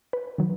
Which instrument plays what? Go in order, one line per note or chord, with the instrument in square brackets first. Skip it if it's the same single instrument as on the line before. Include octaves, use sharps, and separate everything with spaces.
[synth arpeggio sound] B4
D#3 F#3